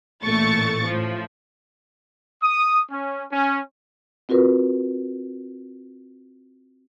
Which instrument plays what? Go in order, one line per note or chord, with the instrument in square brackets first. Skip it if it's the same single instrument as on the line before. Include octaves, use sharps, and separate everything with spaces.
[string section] A1 A#2 A3 C#6 A6
A2 F3
[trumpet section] D#6
C#4
C#4
[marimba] C4 F4 F#4 A#4 B4